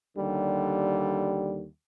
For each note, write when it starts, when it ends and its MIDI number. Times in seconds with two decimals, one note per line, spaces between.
0.17 1.65 39
0.17 1.65 50
0.17 1.65 55